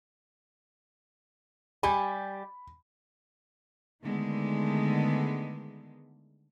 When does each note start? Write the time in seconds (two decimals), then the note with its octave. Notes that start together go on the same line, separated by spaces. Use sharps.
1.83 G3 G4 G#5 B5
4.03 D3 D#3 G#3 A3 B3